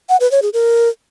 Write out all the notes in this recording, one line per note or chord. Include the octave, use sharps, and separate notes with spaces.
F#5
B4
C#5
G#4
A#4